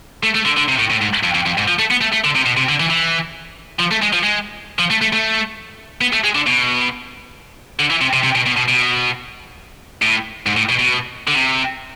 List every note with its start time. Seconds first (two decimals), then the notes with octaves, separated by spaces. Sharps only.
0.23 A3
0.35 A3
0.46 D3
0.57 D3
0.69 C3
0.79 A2
0.90 A2
1.01 G#2
1.23 F2
1.34 F2
1.46 F2
1.58 G#2
1.68 F3
1.79 A3
1.91 B3
2.01 A3
2.12 A3
2.24 D3
2.35 C3
2.46 B2
2.57 C3
2.69 D3
2.80 E3
2.90 E3
3.79 F3
3.91 A3
4.02 G#3
4.13 F3
4.23 G#3
4.79 F3
4.91 A3
5.01 A3
5.13 A3
6.01 B3
6.13 A3
6.24 G#3
6.35 D3
6.46 B2
7.80 D3
7.91 E3
8.01 C3
8.13 C3
8.23 C3
8.35 B2
8.46 B2
8.57 B2
8.68 B2
10.02 A2
10.46 G#2
10.57 A2
10.69 B2
10.79 B2
11.28 D3
11.35 C3